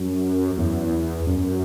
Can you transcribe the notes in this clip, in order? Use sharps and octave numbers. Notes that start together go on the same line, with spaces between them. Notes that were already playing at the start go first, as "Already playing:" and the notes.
Already playing: F#2
E2
F#2